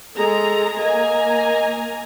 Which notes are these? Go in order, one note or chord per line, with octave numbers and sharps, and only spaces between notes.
G#3 G#4 A4 A#5
A#3 D#5 G#5 A#5